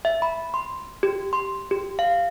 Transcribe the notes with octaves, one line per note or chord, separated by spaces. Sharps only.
E5
B5
C6
G4
C6
G4
F5